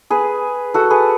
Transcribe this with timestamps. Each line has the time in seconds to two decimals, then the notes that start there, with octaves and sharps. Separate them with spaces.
0.10 G#4 B4
0.74 F#4 A4
0.90 G#4 B4